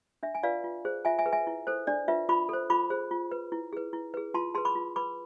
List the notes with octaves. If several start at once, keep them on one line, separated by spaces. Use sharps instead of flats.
D4 E5
G#5
F4 B4 D5 F5
F4
G#4 C5
F4 E5 G#5
E5 G#5
G#4 B4
E5 G#5
E4
A4 C5
D4 D5
F4 B4 E5
F4 B5 D6
A4 C5
F4 B5 D6
G#4 C5
F4
B4
E4
G#4 B4
E4
G#4 B4
F4 A5 C6
G#4 B4 A5 C6
B5 D6
F4
B4 B5 D6